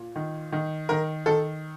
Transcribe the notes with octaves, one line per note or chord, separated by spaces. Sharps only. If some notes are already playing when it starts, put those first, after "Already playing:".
Already playing: A#2
D#3
D#3
D#3 A#4
D#3 A4